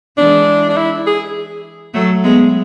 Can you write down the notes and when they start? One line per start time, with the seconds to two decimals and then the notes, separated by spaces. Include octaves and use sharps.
0.18 E3 G#3 D4
0.69 D4
0.77 E4
1.07 G#4
1.94 F#3 A3
2.24 G#3 B3